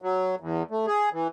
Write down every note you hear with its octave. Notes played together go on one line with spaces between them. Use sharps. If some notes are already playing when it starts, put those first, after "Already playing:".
F#3
E2
A3
G#4
E3